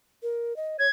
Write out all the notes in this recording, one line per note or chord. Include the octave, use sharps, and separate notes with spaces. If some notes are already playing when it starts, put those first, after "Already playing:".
A#4
D#5
C#5 G#6